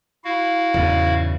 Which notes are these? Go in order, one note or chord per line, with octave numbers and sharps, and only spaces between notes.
E4 F#4 F5
E2 G#2 C#3